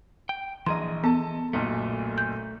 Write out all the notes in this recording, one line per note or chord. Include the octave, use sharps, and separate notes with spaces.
G5
A#1 E3 G#4 D#5 A#5 C6
B3 A4 A5
F#1 B1 A#2 A3
G6